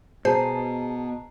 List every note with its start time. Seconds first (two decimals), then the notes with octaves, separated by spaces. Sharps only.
0.25 B2 G#4 C5 A5 A#5 C7